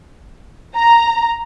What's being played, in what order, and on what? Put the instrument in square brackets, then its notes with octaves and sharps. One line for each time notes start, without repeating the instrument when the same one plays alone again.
[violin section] A#5